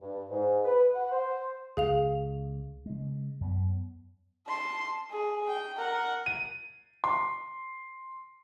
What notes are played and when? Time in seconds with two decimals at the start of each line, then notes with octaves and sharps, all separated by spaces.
0.02 G2
0.30 G#2
0.65 B4
0.94 F#5
1.12 C5
1.77 C#2 G#4 F5 F7
2.86 C#3 G#3
3.41 F#2 B3
4.47 A5 C6
5.11 G#4
5.48 G5
5.77 A#4 F#5
6.26 D#7
7.04 C6